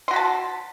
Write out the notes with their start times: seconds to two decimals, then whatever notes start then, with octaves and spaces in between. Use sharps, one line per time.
0.08 C6
0.11 F#4
0.13 B5
0.16 A5